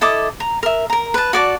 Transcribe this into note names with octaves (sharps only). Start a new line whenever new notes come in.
E4 A4 D#5 D6
A#5
A#4 E5
A#4 A#5
B4 A5
F#4 D5 A5